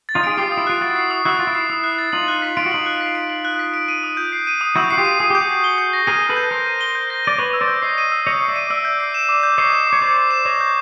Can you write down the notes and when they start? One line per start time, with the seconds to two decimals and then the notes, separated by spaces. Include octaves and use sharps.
0.09 A6
0.15 D#4 F4
0.23 G#4 D7
0.37 F4 G4 C7
0.52 D#6
0.57 E4
0.67 F4 F#6
0.81 E4 F#4 A6
0.96 C7
1.11 D#6
1.25 E4 F#4 F#6
1.39 F4 A6
1.47 E4
1.55 C7
1.69 E4 D#6
1.84 F#6
1.98 A6
2.12 D#4 F4 F#7
2.28 F#6
2.42 B6
2.57 F4 D7
2.66 F#4
2.71 D#4 F4 F#7
2.86 F#6
3.01 B6
3.15 D7
3.29 F#7
3.45 F#6
3.59 B6
3.74 D7
3.88 D#7
4.04 D#6
4.17 G6
4.32 C7
4.47 D#7
4.61 D#6
4.76 E4 F#4 G6
4.90 F#4 C7
4.97 F4 G4
5.05 D#7
5.19 G#4 D#6
5.30 G4 G6
5.41 F#4 G#4
5.49 C7
5.64 G7
5.78 G6
5.93 A#6
6.07 G#4 A#4 D#7
6.22 G7
6.29 A4 B4
6.37 G6
6.51 A#4 C5 A#6
6.66 D#7
6.81 G7
6.95 G6
7.10 A#6
7.25 D5 D#7
7.38 B4 C#5 D#7
7.53 E6
7.61 C5 D5
7.68 G6
7.82 C#5 D#5 C7
7.98 D#7
8.12 E6
8.27 C#5 D#5 G6
8.41 C7
8.48 D5 E5
8.56 D#7
8.70 D5 E5 E6
8.85 G6
9.00 C7
9.14 E7
9.29 D6
9.43 G6
9.58 C#5 D#5 C7
9.72 E7
9.87 D6
9.93 C#5
10.02 C5 D5 G6
10.17 C7
10.31 E7
10.45 C#5 D#5 D6
10.61 G6